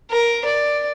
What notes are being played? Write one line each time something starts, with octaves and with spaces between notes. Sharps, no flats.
A#4
D5